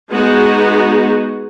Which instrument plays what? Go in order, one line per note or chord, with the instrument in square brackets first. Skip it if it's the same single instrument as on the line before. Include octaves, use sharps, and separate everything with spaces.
[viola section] G#3 B3 D#4 F#4